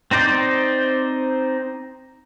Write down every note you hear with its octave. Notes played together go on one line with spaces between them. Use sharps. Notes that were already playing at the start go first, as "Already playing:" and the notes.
C4 D#4 C5 D5